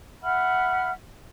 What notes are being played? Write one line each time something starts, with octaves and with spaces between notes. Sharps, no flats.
E5 F#5 B5 F6